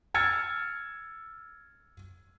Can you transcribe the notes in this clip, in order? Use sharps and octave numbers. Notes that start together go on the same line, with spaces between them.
E6 F6 G#6 A6 C#7